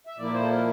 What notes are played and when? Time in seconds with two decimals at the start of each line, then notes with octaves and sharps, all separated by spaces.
0.07 E5
0.18 A#2 F3 A#3 E4 D5
0.34 C5
0.42 A4
0.50 A#4